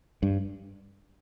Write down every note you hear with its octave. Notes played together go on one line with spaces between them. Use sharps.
G2